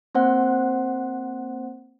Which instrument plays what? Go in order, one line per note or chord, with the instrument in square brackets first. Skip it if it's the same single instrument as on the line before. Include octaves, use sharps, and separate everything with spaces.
[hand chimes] A#3 C4 C5 F#5